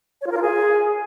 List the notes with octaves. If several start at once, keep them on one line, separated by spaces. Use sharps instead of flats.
C#5
F4
A#4
F4
G#4